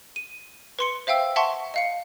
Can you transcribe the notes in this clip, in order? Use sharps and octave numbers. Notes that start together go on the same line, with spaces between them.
D#7
B4 C6 C#7
C5 E5 F5 G5 E6
E5 F#5 A5 C6 C#6
D#5 F5 C#7